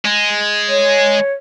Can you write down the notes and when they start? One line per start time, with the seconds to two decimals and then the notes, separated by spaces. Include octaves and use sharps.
0.05 G#3
0.68 C#5